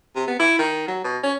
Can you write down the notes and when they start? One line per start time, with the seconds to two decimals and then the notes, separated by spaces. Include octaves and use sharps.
0.15 C3
0.28 B3
0.40 E4
0.59 D#3
0.88 F#3
1.04 B2
1.23 C#4